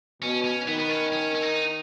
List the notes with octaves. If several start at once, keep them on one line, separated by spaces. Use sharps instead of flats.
B2 C#4
C#4
D#3 B3
B3
C#4
C#4
C#4
D#4